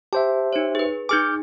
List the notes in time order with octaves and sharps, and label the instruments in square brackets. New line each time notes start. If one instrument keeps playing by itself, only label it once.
[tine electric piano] G4 C5 E5 [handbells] A5
[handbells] D#4 C#5
G#4 B4
[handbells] D#4 G#4 G#5 [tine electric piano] D6 F6 G6